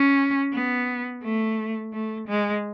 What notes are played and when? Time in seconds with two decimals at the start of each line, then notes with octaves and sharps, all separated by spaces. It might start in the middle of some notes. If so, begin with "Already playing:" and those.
Already playing: C#4
0.53 B3
1.23 A3
1.93 A3
2.28 G#3